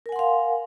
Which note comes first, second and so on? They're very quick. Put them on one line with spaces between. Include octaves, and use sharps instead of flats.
A#4 G#5 F#5 C6 F5